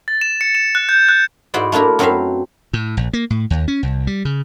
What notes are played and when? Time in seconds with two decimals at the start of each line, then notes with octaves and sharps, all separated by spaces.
0.08 A6
0.21 E7
0.41 C#7
0.55 E7
0.75 F#6
0.89 G6
1.09 F#6
1.54 G#2 E4 F#4 C5 D5
1.72 A3 A#3 D4 E4 A#4
1.99 F#2 F#3 C4 B4 E5 F5
2.73 A2
2.97 A#1
3.13 A#3
3.30 A2
3.50 D#2
3.68 C#4
3.83 C2
4.07 G3
4.25 C#3